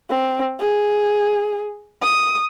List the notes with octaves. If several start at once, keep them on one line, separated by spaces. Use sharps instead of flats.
C4
G#4
D#6